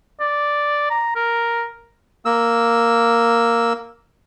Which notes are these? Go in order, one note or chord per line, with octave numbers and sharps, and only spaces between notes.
D5
A#5
A#4
A#3 E6